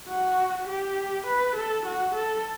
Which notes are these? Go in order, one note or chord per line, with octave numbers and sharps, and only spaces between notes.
F#4
G4
B4
A4
F#4
A4